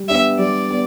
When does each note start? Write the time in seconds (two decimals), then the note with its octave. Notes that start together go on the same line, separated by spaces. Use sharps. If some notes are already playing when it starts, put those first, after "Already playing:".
Already playing: G3
0.08 B3 D4 G4 E5
0.39 G3 D5
0.71 B3